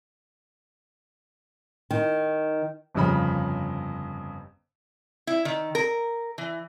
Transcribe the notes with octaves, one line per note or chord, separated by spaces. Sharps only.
D#3
G1 F2 C#3 B5
E4
D#3
A#4
E3